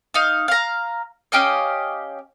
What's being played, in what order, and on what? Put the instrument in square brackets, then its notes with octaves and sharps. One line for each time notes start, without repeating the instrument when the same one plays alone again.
[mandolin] D#4 F5
F5 A#5
C#4 G4 D#5 F5